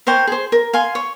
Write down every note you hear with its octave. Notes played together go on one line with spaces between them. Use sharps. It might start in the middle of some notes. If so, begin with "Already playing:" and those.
A#4 C5 C#5 G5
G#4 C5
A#4
F5 G#5 C6
C#5